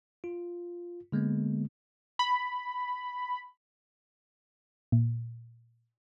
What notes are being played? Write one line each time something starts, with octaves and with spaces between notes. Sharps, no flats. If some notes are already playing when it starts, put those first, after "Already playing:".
F4
D3 G#3 A#3 B3
B5
A#2